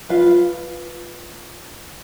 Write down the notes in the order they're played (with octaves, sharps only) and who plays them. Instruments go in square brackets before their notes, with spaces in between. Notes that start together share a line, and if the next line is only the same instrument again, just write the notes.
[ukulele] F4 B4 F5